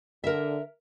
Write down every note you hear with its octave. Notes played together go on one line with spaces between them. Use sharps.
D3 A#4 E5